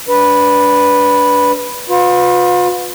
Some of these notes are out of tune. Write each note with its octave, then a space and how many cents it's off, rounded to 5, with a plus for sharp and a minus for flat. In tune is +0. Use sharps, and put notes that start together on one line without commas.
D4 -20 B4 -5
F4 +40 B4 +10